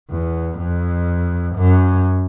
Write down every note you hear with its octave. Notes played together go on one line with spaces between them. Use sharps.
E2
F2
F#2